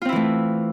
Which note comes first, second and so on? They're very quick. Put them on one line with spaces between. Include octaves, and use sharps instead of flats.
F4 C4 E4 E3 A3